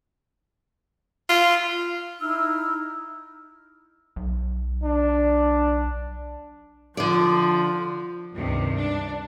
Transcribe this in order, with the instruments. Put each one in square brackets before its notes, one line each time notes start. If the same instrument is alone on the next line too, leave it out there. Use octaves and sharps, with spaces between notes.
[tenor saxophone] F4
[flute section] D#4 E4 E6 F6
[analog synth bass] B1
[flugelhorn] D4
[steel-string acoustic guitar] D3 D5 [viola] F3
[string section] C#2 G2 C3 D#3
D4